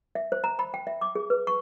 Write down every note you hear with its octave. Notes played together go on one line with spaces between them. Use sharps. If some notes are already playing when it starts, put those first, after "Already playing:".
E5
C5
A#5
B5
G5
E5
D6
G#4
B4
C#6